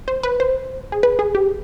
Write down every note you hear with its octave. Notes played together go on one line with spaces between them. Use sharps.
C5
B4
C5
G#4
B4
G#4
G4